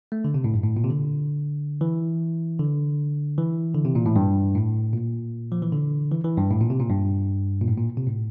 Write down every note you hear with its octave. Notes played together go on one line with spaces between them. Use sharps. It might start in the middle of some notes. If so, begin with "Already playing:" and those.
A3
D3
C3
A2
G2
A2
A#2
C3
D3
E3
D3
E3
D3
C3
A#2
A2
G2
A2
A#2
F3
E3
D3
E3
E3
G2
A2
A#2
C3
A#2
G2
A#2
A2
A#2
C3
A2